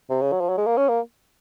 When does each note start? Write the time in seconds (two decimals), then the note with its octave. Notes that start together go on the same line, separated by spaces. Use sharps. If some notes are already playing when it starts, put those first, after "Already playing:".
0.10 C3
0.21 C#3
0.32 F#3
0.40 F3
0.49 F#3
0.57 G#3
0.66 A#3
0.77 C#4
0.88 A#3